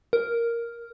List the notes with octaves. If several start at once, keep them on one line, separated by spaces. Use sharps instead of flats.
A#4